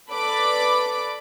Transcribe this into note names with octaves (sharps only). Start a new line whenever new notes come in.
A4 B4 D5 B5 D6